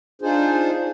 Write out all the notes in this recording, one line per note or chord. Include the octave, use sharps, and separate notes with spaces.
D4 D#4 F4 G#4 C5